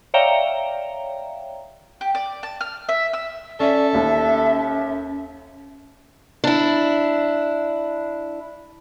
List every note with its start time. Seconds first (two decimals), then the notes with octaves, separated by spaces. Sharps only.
0.14 C#5 D5 E5 F5 G5 A#5
2.01 G4
2.15 D5
2.43 A5
2.61 F6
2.89 E5
3.13 E6
3.60 C#4 A4 D5 E5
3.94 D#2 C#4
6.44 D4 E4